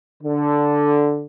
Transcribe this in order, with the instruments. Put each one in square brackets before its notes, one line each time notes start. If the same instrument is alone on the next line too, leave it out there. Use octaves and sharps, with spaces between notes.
[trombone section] D3